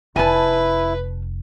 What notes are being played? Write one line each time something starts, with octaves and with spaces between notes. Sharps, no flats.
F1 E4 B4 G#5 A5